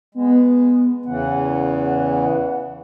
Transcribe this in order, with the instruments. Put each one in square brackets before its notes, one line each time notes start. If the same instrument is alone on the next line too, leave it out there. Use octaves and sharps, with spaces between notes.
[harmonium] G#3 [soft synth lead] B3
[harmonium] E2 C#3 E3 [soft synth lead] F#5